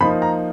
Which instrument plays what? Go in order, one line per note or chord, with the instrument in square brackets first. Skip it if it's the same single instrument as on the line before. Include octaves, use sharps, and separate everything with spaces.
[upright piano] F3 A#3 D#4 B5
A#5